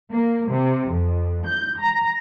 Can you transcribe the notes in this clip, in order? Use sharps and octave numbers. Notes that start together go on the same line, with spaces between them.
A#3
C3
F2
G6
A#5